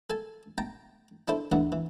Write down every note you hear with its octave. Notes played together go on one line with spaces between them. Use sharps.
A4 G#5 A5
G5 A5 A#5
D4 E4 A4 C5
D2 G2 E3 A3 F#5
E3